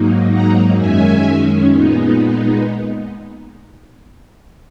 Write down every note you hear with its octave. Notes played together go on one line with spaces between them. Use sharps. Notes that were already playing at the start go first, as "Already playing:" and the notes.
Already playing: G#2 F#3 A#3 D#4
F#5 A#5
F#2 D#3 G#3 C#4 E5 G#5
A#2 G#3 B3 D#4